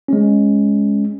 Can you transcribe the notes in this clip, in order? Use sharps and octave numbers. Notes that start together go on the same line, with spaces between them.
G#3 C#4